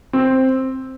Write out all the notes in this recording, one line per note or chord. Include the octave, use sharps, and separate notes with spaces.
C4